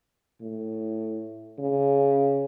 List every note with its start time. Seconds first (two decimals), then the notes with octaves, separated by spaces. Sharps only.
0.41 A2
1.59 C#3